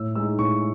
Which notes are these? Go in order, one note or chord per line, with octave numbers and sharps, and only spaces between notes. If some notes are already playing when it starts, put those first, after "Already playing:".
Already playing: A2 E6
G#3 D#4 E6
A2 C#6